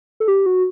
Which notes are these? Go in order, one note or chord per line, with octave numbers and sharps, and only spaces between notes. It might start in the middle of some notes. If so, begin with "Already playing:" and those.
A4
G4
F#4